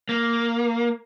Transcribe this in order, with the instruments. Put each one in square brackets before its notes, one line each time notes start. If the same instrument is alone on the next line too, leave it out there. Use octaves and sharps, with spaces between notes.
[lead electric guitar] A#3